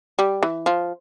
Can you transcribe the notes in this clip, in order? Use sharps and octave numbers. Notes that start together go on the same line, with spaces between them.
G3
E3
F3